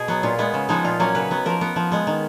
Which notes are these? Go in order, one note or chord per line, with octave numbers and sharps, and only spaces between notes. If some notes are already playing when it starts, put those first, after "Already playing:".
Already playing: B2 G#4
F#3 B3
A#2 F4
G#3 B3
C#3
F3 G#3 B3 D#4
A#2 F4
F#3 A#3 C#4
C#3 B4
F#3 B3
F3 A#4
B3
F3
G#3 B3
D#3